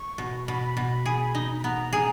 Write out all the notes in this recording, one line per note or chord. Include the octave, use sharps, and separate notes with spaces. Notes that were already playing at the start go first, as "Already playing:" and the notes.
Already playing: C#6
B2
B2 B5
B2
G#4
D#4
B5
B3 A#5
G#4 A#5